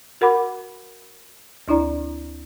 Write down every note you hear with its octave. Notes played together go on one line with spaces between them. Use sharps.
F#4 A#4 F#5 B5 D6
D2 D4 E4 D5 A#5